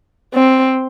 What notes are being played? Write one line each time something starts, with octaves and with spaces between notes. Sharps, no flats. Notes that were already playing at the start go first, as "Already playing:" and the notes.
C4